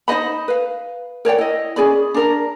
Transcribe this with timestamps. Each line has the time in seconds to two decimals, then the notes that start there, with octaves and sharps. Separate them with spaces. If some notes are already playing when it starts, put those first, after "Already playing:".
0.08 D#4 C5 D#5 B5
0.48 B4 F5
1.25 A#4 C#5 D5 G5
1.38 E4 D#5
1.76 C#4 G#4 D5 B5
2.14 D4 A#4 A#5